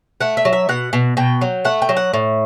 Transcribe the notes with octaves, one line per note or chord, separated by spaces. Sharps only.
A3 F#5
E5
F#3
E5
B2 F#5
B2
B2 G5
F#3
A3 F#5
G5
F#3
F#5
A2